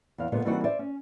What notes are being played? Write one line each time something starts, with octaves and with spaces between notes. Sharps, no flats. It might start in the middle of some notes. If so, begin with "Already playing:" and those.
E2 F5
A#2 D3 G#3 A#3 B3 F4
E3 G3 A#3 C4 D#4 F#4
C5 D5 E5
C#4